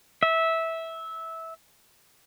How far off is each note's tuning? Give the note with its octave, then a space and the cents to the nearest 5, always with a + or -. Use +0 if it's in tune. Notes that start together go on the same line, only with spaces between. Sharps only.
E5 -15